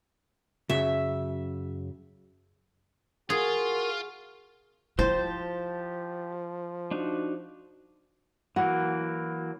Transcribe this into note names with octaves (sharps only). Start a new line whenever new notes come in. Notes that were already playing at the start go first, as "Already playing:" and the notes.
F#2 C#3 F#3 E5
F4 F#4 G#4 A#4
F3 E4 G4 C5 A5
D4 D#4 F#4
E3 F#3 A#3 F#4 F#5